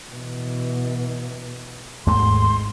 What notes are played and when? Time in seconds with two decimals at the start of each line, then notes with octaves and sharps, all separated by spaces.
0.12 B2 E3
2.07 G#1 D#2 G#2 A3 C6